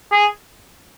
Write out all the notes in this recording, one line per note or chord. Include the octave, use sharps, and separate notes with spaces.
G#4